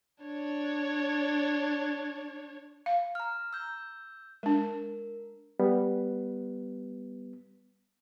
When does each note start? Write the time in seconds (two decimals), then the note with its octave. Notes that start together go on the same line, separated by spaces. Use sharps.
0.24 D4 C#5
2.86 F5
3.15 A#5 F6
3.53 E6 G6
4.43 G#3 D4 A#4
5.60 G3 B3